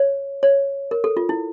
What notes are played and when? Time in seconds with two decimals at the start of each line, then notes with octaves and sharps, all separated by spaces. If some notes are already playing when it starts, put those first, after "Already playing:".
Already playing: C#5
0.43 C#5
0.91 A#4
1.04 A4
1.17 F4
1.29 E4